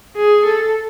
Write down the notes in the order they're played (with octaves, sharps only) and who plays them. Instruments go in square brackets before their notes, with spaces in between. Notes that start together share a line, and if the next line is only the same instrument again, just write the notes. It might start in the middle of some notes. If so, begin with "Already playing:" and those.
[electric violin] G#4
A4